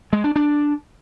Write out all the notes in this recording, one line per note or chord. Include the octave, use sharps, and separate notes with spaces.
G#3
D4
D4